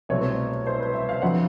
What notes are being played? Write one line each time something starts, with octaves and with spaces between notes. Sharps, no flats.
C2 B2 F#3 A3 C4 C#5
C5
B4
E5
F5
F2 D3 F#3 F#5